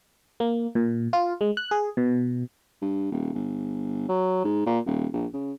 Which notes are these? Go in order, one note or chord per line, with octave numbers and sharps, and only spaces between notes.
A#3
A#2
F4
G#3
F#6
G#4
B2
G2
D#1
G1
F#3
G#2
A#2
D#1
A#1
C#3